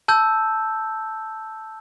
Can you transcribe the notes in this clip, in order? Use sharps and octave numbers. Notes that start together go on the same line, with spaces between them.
A5 E6 G6